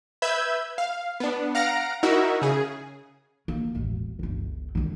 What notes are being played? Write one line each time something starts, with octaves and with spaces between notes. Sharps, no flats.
B4 E5 B5 E6 G6 G#6
F5
B3 D4
F5 F#5 A#5 F6 A#6 D7
D#4 E4 F#4 A#4 E5
C#3 G#4
A#3
E1 A1
G1 C#2
C2 D#3